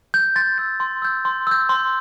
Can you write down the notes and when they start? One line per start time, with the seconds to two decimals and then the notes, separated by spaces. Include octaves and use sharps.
0.14 G6
0.36 C6 A6
0.58 E6 G6
0.80 C6
1.02 E6 G6
1.25 C6
1.47 E6 G6
1.69 C6